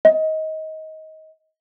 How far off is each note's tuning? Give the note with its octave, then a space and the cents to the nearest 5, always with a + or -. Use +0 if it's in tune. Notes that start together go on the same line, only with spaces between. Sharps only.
D#5 +20